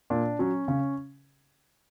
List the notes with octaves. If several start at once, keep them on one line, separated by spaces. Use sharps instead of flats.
A#2 D4
F#3 C#4
C#3 C#4